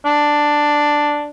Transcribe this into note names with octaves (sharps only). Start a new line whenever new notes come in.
D4